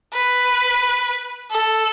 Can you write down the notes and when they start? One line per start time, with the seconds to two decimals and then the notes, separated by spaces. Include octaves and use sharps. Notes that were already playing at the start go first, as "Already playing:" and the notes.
0.14 B4
1.51 A4